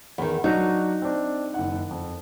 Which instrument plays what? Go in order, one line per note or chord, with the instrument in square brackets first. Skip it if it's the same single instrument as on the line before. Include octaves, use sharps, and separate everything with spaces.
[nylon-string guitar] E2 D#3
[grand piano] F#3 D4 F#4 [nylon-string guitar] D#4
[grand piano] C4 D4
F#1 D#3 F#5
F2